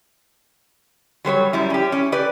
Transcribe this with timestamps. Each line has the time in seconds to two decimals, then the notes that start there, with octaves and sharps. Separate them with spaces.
1.25 F#3 G3 C5 C#5
1.53 F#2 G3 E4
1.70 C#4 G4
1.92 C#4
2.12 G4 B4 D5